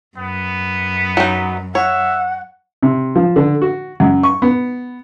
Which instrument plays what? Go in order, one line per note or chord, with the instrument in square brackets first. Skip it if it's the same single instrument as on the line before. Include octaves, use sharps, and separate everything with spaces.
[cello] F#2 [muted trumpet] B3
[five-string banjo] F#3 D#4
[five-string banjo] C#5 [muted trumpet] E5 [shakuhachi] F#5
[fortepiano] C3
F3
D3
F#4
F#2
C#6
B3